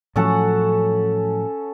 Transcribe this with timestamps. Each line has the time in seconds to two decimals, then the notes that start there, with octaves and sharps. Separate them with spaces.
0.16 A2 F3 F#3 C#4 A4 F#5